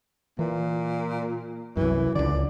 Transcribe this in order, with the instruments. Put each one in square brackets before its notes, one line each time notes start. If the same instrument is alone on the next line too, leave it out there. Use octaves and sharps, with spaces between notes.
[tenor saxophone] A#2 [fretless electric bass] E3
[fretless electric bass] C2 F#2 [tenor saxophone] E3
[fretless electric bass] C#2 D3 [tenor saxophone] D5